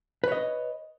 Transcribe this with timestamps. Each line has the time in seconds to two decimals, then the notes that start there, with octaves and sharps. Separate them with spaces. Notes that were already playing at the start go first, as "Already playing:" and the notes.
0.24 B4
0.28 C#5
0.32 D#5